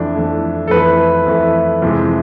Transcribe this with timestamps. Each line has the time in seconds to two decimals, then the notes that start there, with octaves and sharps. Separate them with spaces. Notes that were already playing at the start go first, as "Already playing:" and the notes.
Already playing: F2 E3 A3 D4
0.16 F2 E3 A3
0.68 A4
0.71 F2 E3 A3 B4
1.26 F2 E3 A3
1.82 F2 C3 E3 G#3